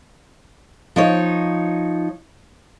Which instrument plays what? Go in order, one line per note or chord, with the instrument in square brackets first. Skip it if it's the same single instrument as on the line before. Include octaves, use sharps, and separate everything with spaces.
[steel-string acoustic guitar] F3 D#4 C#5